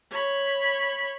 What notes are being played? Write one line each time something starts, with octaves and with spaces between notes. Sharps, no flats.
C#5 B5